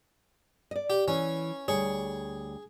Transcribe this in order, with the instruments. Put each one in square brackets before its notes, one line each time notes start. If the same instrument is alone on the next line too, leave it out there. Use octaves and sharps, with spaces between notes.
[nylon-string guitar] D5 D#5
[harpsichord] G4
[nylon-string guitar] E3 [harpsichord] C#4
[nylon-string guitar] D2 G3 C#5 [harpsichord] G#4